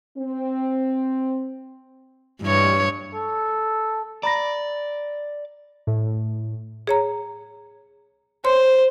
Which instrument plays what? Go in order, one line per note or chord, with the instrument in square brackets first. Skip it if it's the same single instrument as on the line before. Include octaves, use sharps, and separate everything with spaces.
[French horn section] C4
[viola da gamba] G2 C#5 [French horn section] E3 G3
[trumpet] A4
[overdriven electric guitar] D5 [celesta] A#5 B5 A#6
[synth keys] A2
[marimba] G#4 C#5 A#5
[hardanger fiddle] C5 [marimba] C#5 C6